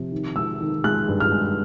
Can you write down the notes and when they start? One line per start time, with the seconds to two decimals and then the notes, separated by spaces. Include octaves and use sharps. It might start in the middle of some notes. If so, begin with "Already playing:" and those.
Already playing: C3 F3
0.12 D#3
0.36 G#3 E6
0.61 D#3
0.84 G#3 F#6
1.08 G2
1.20 F6
1.32 G#3